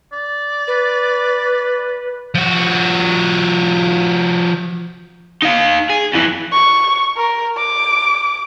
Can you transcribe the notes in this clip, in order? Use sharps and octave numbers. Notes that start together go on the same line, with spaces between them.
D5
B4
F3 F#4
D#4 F5
G#4
F2 E3
C#6
A#4
D6